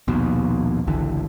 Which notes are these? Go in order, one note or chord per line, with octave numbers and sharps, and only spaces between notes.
A#1 D#2 B2
G#1 C#2 D3 E3